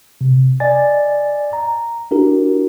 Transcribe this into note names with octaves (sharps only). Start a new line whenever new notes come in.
C3
D5 D#5 G#5 A6
A#5
D4 E4 F#4 G4 A#4